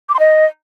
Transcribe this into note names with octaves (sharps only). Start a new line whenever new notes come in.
D6
C6
D#5